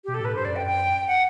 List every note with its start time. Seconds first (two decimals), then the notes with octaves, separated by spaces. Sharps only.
0.04 B2 G4
0.14 A4
0.20 A2 B4
0.33 G2 C5
0.45 F#2 D5
0.56 G5
0.66 G5
1.07 F#5